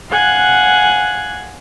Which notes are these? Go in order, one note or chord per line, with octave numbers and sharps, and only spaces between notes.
F5 F#5 G#5 F#6 G#6